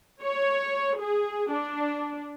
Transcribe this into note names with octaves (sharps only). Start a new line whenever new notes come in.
C#5
G#4
D4